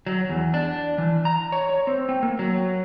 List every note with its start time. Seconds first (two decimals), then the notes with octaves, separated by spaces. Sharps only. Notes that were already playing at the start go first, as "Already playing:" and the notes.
0.06 F#3
0.29 E2
0.54 D4
0.98 E3
1.25 A#5
1.52 C#5
1.69 C#5
1.87 C4
2.09 C4
2.23 A#3
2.39 F#3